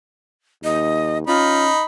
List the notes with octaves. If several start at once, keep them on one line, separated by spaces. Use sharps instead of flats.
D#2 D#5
C#4 D#4 F4 B5